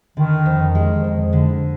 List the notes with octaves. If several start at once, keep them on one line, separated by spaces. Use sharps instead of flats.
D3 D#3
F2
G#3
F2
D3